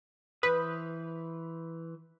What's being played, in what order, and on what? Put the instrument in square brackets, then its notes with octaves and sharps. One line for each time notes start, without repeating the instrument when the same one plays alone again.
[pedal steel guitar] E3 C5 D#6 [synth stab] B4